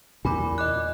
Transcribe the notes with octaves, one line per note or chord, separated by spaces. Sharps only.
E2 A#2 G#5 B5 D6
D#5 D6 F#6